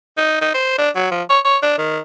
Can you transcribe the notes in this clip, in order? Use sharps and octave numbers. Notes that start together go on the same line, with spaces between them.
D#4
D#4
C5
D4
F#3
F3
C#5
C#5
D4
D#3